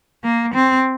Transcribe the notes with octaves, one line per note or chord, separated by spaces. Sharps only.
A#3
C4